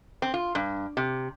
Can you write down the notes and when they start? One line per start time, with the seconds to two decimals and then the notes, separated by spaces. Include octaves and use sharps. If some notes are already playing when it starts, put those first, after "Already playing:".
0.22 C4
0.34 F4
0.55 G2
0.97 C3